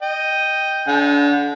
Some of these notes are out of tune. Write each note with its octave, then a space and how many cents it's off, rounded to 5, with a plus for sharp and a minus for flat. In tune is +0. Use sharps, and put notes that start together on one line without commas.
D#5 +0 G5 +0
D3 -35 F#5 -30 A5 -35